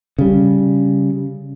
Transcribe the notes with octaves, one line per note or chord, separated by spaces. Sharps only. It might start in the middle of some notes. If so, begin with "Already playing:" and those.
C#3 G3